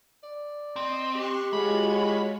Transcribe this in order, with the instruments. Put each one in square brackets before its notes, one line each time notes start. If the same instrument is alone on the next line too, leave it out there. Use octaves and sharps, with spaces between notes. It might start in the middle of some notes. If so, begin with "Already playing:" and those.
[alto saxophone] D5
[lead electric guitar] C4 [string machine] D#5
[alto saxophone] G4 [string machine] C6 C#6 F#6
[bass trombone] G#3 [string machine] F4 F#4 C#5 [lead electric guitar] B5